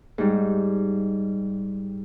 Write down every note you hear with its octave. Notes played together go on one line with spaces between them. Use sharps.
G#2 G3